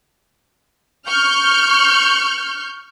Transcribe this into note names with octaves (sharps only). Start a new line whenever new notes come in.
C#6 F6 G6